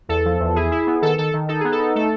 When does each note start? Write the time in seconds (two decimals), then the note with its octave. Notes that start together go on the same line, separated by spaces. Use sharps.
0.09 E2 A4
0.25 F3
0.40 E2
0.56 E4 G#4
0.72 E4
0.87 B3
1.02 D#3 A4
1.18 D#3 A4
1.34 D#3
1.49 D#4 A4
1.60 B3 G#4
1.72 A4
1.79 D#4
1.95 A3 A4